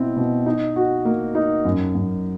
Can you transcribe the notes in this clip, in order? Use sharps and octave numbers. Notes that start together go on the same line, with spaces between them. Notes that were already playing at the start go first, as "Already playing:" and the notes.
Already playing: B2 C4 E4
B2
D#4
F#4
A#3
D#4
F#2
F#2